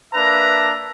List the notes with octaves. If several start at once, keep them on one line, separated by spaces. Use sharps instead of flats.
A#3 D4 B4 E5 A#5